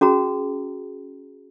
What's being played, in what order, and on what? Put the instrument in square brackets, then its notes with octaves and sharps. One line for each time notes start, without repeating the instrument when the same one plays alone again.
[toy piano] C#4 F#4 G#4 A#5